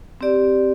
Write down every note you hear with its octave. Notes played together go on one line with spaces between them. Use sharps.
C4 G4 D5